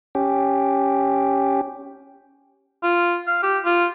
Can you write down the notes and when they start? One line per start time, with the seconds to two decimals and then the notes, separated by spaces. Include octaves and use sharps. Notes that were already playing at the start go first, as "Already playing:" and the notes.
0.15 C#4 G4
2.83 F4
3.27 F5
3.43 G4
3.65 F4